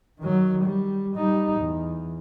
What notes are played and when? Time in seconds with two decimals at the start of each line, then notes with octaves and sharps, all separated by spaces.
0.19 D#3 F#3
0.64 G3
1.16 G3 D#4
1.59 E2